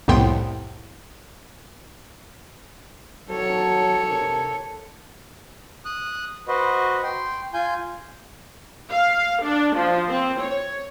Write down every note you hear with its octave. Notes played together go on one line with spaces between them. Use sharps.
C2 F2 A2 B3 G5 C6
F#3 A4 C#5
C3 A#4
D#6 F#6
F#4 B4 C5 D#5
G5 C6
F4 G#5 G6
F5
D4
F3
C4
C#5